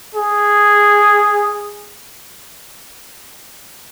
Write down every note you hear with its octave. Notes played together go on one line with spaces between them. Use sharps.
G#4